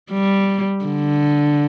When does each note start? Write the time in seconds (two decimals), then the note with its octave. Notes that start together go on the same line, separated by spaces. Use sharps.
0.12 G3
0.85 D3